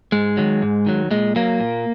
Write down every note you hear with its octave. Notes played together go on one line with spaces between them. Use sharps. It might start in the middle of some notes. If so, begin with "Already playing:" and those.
G#2 G#3
D#3 F#3
G#2
D#3 F#3
A#2 G#3
F#3 A#3
A#2